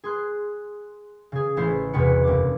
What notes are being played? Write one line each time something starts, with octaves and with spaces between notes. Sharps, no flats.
G#4 C6 F#6
C#3 G#4
A1 E4 C5 C7
G1 E2 C3 F#4 B4 C#7
F#1 D6